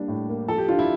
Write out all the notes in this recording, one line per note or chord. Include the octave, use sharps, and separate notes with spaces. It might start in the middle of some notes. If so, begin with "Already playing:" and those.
Already playing: G3 A#3 D4
A2
A#3
F3 A4
G4
D4 F4
E4